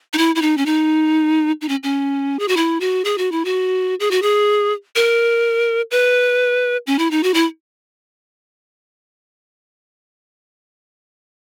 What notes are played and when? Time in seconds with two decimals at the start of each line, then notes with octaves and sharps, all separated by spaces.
0.13 D#4
0.18 E4
0.35 E4
0.42 D#4
0.57 C#4
0.66 D#4
1.61 D#4
1.69 C#4
1.83 C#4
2.39 G#4
2.48 F#4
2.57 E4
2.81 F#4
3.05 G#4
3.18 F#4
3.32 E4
3.45 F#4
4.00 G#4
4.11 F#4
4.22 G#4
4.96 A#4
5.91 B4
6.87 C#4
6.99 E4
7.11 D#4
7.23 F#4
7.34 E4